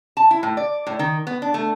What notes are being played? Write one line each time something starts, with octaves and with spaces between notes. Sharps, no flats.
A5
E4
A2
D5
A2
D#3
B3
D4
A3